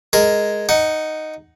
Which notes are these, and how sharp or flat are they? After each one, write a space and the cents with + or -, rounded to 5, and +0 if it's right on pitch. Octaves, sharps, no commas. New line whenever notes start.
G#3 +0 A#4 +0
D#4 +0 F#5 +0